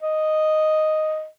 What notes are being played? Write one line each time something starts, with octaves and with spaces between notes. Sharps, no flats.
D#5